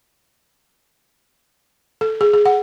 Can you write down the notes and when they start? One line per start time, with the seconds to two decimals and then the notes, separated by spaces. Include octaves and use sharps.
2.01 A4
2.21 G#4
2.34 G#4
2.46 F#5